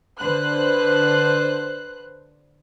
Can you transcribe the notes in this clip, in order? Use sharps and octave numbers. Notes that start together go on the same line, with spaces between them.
D3 B4 C5 F#6